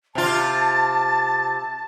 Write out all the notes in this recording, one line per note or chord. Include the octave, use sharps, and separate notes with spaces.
C3 F4 A5